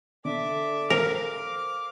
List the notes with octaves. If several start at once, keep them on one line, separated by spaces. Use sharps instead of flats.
D3 A4 E5 D6
A#4 C5 F5